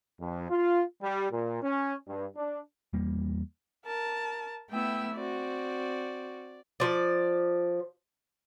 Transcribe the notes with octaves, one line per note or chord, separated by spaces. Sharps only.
F2
F4
G3
A#2
C#4
G2
D4
E2 G3 A#3
A#4 A5
A3 B3 E4 G5 E6
C4 F#4 D5
F3 D5